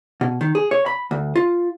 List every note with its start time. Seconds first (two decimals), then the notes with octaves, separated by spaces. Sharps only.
0.21 B2
0.41 D#3
0.55 G#4
0.71 C#5
0.86 B5
1.11 D2
1.36 F4